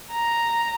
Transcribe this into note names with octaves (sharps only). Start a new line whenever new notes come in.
A#5